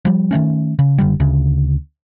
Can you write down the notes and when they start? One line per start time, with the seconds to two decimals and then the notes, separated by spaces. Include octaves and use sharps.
0.05 F3 G3
0.31 D#3 F3 A3 C#4
0.79 C#3
0.98 F#1 D3 G3
1.20 D2 C#3